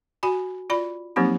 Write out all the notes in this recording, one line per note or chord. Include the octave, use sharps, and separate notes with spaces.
F#4 G#5 B5
F4 D5 B5
F3 F#3 A#3 C4 D#4 G4